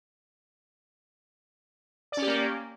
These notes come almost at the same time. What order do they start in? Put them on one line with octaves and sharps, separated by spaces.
D5 C#4 G4 A#3